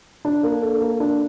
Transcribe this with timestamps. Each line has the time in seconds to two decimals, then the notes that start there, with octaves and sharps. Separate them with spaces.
0.25 D4
0.43 A#3
0.62 A4
0.81 A#3
1.00 D4